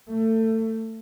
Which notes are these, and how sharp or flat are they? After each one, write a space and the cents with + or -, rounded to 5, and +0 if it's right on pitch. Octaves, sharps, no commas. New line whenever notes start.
A3 +25